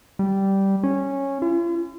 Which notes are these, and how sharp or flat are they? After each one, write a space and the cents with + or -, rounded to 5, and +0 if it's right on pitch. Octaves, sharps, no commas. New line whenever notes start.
G3 -10
C#4 -10
F4 -45